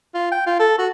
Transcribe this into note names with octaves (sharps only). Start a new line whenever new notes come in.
F4
G5
F4
A4
F#4